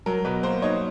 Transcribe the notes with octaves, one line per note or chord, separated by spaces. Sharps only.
F#3 A#4
B2 B4
A#3 C5
D#4 C#5